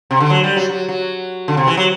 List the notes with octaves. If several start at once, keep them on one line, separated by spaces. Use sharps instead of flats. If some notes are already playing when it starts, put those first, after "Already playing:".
C3
D3
F#3
G3
F#3
F#3
F#3
D3
C3
E3
F#3